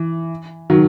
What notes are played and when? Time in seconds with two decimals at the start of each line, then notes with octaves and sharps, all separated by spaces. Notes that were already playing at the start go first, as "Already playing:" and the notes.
Already playing: E3
0.70 D#3 F#3